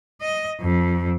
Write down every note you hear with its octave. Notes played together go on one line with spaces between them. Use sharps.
D#5
F2